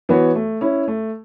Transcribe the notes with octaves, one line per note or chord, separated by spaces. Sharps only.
E3 B3 F#4 C#5
A3
C#4 E4
A3